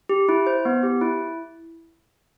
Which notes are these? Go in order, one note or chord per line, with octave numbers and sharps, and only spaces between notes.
G4
E4
C5
B3
G4
E4